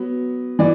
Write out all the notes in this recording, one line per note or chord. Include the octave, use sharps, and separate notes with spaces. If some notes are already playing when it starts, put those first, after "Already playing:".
Already playing: F#3 B3
E3 D5